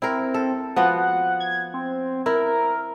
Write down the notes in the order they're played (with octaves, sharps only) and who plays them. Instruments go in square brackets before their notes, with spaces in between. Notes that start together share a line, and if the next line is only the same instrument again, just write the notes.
[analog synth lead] C4 [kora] E4 A#4
[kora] A4
[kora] F3 B3 F#4 [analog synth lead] F#5
[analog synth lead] G#6
C4
[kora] E4 [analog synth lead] A#4